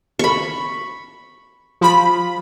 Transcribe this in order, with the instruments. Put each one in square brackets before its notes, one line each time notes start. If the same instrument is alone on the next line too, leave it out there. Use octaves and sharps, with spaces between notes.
[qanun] B5 C#6
[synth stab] F3 B5